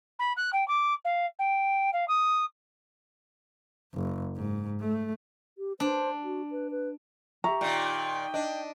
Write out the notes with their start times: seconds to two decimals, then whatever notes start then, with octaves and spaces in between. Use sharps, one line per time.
0.19 B5
0.36 F#6
0.52 G5
0.68 D6
1.04 F5
1.38 G5
1.93 F5
2.07 D#6
3.94 F#1
4.36 G#2
4.80 A3
5.58 G4
5.80 D4 C5
6.24 F#4
6.51 B4
6.71 B4
7.44 G4 E5 A#5 C#6
7.61 A#2 D#3 G5
8.34 D4 D#5